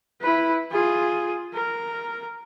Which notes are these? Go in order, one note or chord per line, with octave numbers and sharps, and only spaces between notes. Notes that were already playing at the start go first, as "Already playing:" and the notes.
E4 B4
F4 G#4
A#4